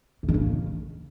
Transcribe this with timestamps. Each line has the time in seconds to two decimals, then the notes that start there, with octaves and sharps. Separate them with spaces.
0.23 C3
0.29 D#3
0.34 C#3